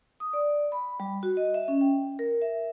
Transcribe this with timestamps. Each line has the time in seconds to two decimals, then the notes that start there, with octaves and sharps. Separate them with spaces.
0.20 D#6
0.33 D5
0.72 B5
1.00 G3
1.23 F#4
1.37 D#5
1.54 E5
1.68 C#4
1.81 G5
2.19 A#4
2.42 E5